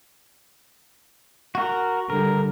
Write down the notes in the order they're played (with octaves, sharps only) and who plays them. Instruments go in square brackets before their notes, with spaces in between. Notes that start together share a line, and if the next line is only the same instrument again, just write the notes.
[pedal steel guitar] F#4 A#4
[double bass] D3 G3 [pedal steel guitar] A#4